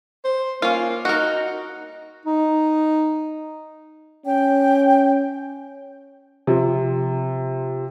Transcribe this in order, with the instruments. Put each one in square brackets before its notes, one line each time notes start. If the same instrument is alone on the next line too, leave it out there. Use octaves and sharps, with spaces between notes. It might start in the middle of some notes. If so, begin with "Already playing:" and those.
[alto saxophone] C5
[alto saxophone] A#3 [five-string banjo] C#4 F4
[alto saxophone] D#4 [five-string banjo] F#4 A#4
[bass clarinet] D#4
[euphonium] C#4 [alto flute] G5
[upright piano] C3 F3